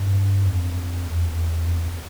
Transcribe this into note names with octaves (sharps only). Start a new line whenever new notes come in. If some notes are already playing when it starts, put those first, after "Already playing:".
Already playing: G2
F2
E2
F2
E2